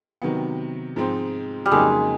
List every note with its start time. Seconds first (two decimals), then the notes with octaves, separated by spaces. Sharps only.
0.22 C3 D#3 F#3 B3
0.96 G#2 F3 G#3 C4 D#4
1.66 G3
1.71 F2 C#3 F#3 G#3 A#3 D#4